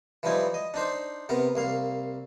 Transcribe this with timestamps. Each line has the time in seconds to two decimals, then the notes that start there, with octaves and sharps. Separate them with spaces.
0.23 E3 F3 G3 D#4 E4
0.54 D#5
0.74 D4 D#4 C5
1.29 C3 B3 A#4
1.55 C2 A#3 F5